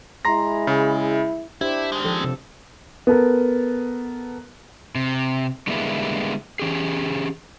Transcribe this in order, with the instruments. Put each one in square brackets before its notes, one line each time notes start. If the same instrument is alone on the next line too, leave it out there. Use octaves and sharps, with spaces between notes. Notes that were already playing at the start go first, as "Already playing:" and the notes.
[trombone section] G#3 E4 [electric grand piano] A#5 C6 A#6
[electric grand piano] C#3
[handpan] D4 G4 C5 [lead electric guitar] E4
[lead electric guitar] D#3 G#3
[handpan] F3 A4
C3 C4
[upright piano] B3 A4 A#4
[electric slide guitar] C3
D3 G3 G#3 A#3 B3 E4
E3 C#4 G4 G#4